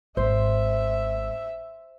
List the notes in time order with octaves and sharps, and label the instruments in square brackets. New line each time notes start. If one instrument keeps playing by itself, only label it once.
[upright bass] G#1 [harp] C5 [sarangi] E5